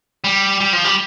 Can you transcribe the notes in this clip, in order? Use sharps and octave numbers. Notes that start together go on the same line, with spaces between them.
G3
G3
F3
G3